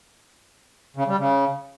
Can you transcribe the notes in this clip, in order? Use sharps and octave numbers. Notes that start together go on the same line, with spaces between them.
C#3
G3
C#3